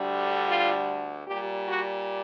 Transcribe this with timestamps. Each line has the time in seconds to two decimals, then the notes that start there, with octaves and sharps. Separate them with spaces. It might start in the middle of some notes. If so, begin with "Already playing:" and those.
Already playing: D2 D3 G3
0.46 F4
1.26 A#2 G3 G4
1.66 F#4